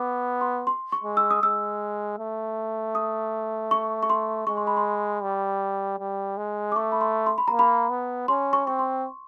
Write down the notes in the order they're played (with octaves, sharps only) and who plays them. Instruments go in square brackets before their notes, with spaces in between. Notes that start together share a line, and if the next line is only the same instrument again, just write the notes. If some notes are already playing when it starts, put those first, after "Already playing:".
Already playing: [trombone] B3 [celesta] D6
[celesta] C6
C6
C#6
[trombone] G#3
[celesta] E6
D#6
[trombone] G#3 [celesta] E6
[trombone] A3
[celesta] D#6
C#6
C#6
C6
[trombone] G#3 [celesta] C#6
[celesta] C6
B5
C6
[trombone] G3
G3
G#3
[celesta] D6
[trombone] A3 [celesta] C#6
[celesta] B5
C6
C6
B5
[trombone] A#3 [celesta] A#5
[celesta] B5
[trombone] B3
[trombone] C#4 [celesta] C6
[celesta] C#6
[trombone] C4 [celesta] C#6
[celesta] C6